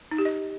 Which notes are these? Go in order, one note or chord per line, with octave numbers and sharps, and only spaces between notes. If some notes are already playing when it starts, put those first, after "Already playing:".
D#4
G4
D#5